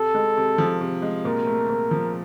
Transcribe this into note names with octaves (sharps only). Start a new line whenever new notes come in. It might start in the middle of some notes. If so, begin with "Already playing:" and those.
Already playing: C3 A4
G#3
C3
F3
C3
G#3
A#2 A#4
A3
A#2
F3